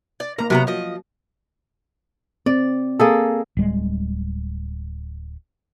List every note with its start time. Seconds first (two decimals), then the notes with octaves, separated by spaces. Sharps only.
0.20 D5
0.38 A#3 A#4 A#5
0.50 C3 F#3 B3 F#4 A#5
0.67 F3 D#5
2.46 C4 D5
2.99 A#3 G#4 A4
3.57 D1 G3 G#3